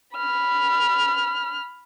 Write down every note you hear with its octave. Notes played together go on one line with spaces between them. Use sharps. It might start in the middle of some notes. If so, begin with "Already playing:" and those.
B5 F6